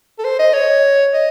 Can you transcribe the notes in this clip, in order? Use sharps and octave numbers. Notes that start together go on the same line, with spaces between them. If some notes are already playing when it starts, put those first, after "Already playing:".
A4
C5
D#5
C#5
D#5